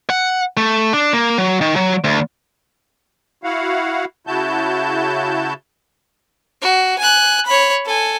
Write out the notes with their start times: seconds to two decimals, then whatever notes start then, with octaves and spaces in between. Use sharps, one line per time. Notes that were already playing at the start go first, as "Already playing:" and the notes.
0.10 F#5
0.57 A3
0.93 D4
1.13 A#3
1.38 F#3
1.61 D#3
1.76 F#3
2.04 D2
3.44 E4 F#4 F5 F#5
4.27 C#3 E4 F#4 A5 G6
6.62 F#4
6.99 G#5 F#6
7.46 C#5 B5
7.85 A4 G#5